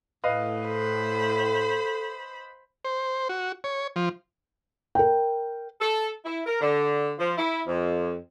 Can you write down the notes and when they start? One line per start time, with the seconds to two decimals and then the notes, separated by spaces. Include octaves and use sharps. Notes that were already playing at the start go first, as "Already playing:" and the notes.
0.24 A2 B4 D#5 F5
0.67 A4 C5 B5
2.85 C5
3.29 F#4
3.64 C#5
3.96 F3
4.95 A#4 G5
5.81 A4
6.25 E4
6.46 A#4
6.61 D3
7.19 F3
7.38 E4
7.67 F2